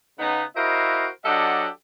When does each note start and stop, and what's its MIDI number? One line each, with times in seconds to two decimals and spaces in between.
0.19 0.44 49
0.19 0.44 59
0.19 0.44 63
0.57 1.09 64
0.57 1.09 66
0.57 1.09 70
0.57 1.09 72
0.57 1.09 75
0.57 1.09 77
1.25 1.68 54
1.25 1.68 62
1.25 1.68 67
1.25 1.68 69
1.25 1.68 75
1.25 1.68 78